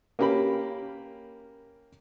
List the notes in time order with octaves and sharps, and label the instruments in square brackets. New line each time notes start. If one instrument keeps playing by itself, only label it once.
[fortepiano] A#3 C#4 G4 A#4 B5